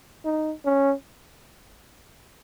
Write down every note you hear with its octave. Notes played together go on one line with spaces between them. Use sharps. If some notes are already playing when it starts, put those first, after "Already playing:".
D#4
C#4